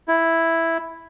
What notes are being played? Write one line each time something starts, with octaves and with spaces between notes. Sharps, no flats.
E4